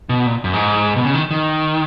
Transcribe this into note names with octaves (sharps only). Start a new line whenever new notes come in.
B2
A#2
F#2
G#2
B2
C#3
D#3
D#3